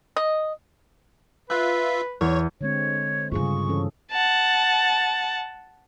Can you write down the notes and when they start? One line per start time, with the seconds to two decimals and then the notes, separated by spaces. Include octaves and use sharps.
0.16 D#5
1.50 F4 B4 E5 F#6
2.21 E2 C#5
2.61 D3 G#3 C4 C#5
3.31 G2 C#3 F4 G#4 C#6
3.68 E3 C#4 A4
4.11 F#5 A5